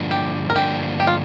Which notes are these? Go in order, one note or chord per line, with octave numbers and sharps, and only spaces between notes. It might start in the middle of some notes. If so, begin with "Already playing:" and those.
Already playing: G2 D3 F3 A#3 D4
G4
A#4
G2 D3 F3 A#3 D4 G4
G4
F4